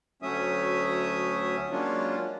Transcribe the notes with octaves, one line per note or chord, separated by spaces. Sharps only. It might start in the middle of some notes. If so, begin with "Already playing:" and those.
D2 F#3 A3 C#4 E5 D#6
F#3 G#3 A#3 C#4 D4 F4